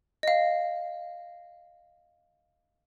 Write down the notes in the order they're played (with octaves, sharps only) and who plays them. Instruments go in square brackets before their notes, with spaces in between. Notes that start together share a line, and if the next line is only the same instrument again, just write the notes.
[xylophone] D#5 F5